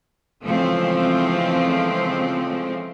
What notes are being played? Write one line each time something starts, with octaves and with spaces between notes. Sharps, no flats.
C#3 E3 F3 G#3 A3 C4